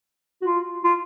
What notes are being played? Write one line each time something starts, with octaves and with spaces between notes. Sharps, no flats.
F#4
F4
F4